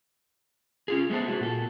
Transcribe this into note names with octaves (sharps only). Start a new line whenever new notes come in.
C#4 F4 G#4
G#3 A3 B3 C5 A5
G#3 E4 F#4
A#2 A4